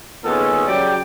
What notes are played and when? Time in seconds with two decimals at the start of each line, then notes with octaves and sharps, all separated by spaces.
0.25 A#2 D#3 G#3 B3 C#4 A4
0.68 C#3 F#3 G4 D5 G5